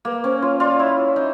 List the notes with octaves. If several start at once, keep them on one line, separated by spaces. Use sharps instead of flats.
A#3 B4
C#4 C5
F4 C#5
F4 D5
E4 C#5
D#4